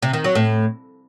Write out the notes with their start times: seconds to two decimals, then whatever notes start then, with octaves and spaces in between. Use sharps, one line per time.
0.02 C3
0.13 D#3
0.24 F#3
0.35 A2